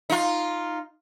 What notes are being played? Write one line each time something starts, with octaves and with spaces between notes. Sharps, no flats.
D#4 F4